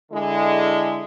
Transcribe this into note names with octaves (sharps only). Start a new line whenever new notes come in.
D3 G#3 E4